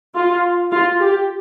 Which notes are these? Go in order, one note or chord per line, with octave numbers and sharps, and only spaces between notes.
F4
F4
G4